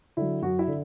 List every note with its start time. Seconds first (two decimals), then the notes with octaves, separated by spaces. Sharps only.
0.17 D3 F#3 E4
0.42 F#2 F#4
0.59 E4 E5
0.68 D3